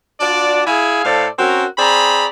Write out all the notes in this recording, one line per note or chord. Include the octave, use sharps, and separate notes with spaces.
D4 F4 F#4 D5
E4 G#4 F5 G#5
A2 A4 C5 D5 F5
C4 C#4 F#4 A#4
C4 G#4 D5 A#5 B5